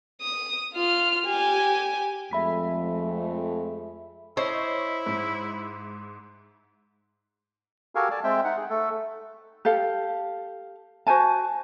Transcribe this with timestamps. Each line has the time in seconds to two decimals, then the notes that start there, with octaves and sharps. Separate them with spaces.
0.21 D#6
0.74 F4 F6
1.27 G4 G#5
2.31 F2 G#3 A3 E5 B5 B6
4.37 E4 C5 C#5 D#5
5.06 G#2
7.95 F#4 G4 A4 A#4 F5 G#5
8.11 D5 G#5 A5
8.24 G#3 C4 E5 G5
8.45 D#4 F#5
8.57 G#4
8.70 A3 A4
9.65 G4 A4 F5
11.07 F#4 C5 G#5 A5